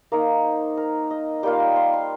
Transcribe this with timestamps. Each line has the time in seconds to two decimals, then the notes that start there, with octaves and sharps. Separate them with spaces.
0.12 A#3 D#4 A#4
0.44 C5
0.77 A#4
1.11 D#5
1.43 G3 A#3 F4 G5
1.53 F5
1.60 G5
1.76 C6
1.93 C6